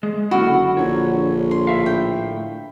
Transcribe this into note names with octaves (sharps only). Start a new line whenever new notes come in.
G#3 G#4
F#1 D3 E4 F#4 A4 A#4
A#1 C#5
C6
A2 E5 F5
G5